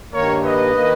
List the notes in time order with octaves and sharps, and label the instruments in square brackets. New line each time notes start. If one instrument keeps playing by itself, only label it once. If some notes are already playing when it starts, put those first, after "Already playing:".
[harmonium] G2 D#3 A#3 [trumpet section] A#4 C#5
[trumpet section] B4 D#5
[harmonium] D#3 A#3